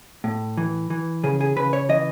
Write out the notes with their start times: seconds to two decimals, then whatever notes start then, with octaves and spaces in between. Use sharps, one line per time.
0.24 A2
0.57 E3
0.90 E3
1.24 C#3 G#4
1.41 G#4
1.56 C#3 B4
1.73 C#5
1.89 E3 D#5